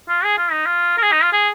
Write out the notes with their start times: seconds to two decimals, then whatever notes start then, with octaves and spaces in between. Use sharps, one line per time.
0.08 F4
0.24 G#4
0.38 F4
0.52 D#4
0.66 F4
0.97 A#4
1.02 G#4
1.12 D#4
1.23 F4
1.33 G#4